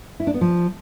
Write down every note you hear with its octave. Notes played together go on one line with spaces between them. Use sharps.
E4
D4
B3
F3